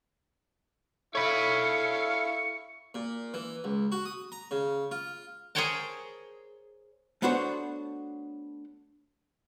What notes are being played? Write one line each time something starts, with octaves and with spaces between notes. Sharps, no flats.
E4 A4 C#5 F5 B5 C#6
A#2
E3
C#2
F#4
D#6
A#5
C#3
F4
G#4 A#4 C5 C#5 G5 A5
A3 B3 D4 F#4 C5 C#5